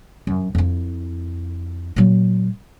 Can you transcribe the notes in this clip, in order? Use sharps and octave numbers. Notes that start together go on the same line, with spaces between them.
F#2
F2 E4
A#2 F#3